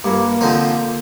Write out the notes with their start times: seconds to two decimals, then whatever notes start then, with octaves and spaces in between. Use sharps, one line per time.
0.04 G2 A#3
0.41 D3 F3 C4 D#4